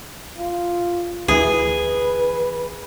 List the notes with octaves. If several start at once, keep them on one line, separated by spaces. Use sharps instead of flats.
F4
D2 E3 G#4 B4